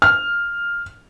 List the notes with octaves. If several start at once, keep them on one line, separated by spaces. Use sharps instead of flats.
F6